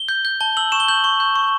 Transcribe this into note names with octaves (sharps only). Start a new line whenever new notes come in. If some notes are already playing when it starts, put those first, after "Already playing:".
Already playing: G7
G6
G6
A5 G7
E6 F#7
C#6 E7
G7
G6 F#7
C#6 G7
G6
C#6